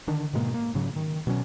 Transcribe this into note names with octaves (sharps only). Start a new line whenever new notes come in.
D3 D#3 D4
G#2 B2 G#3 A#3
A#3
G#2 C#3 F#3
D#3
B2 F#3 C#4